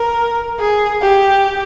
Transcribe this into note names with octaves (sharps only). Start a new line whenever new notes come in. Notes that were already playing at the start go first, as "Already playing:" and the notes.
Already playing: A#4
G#4
G4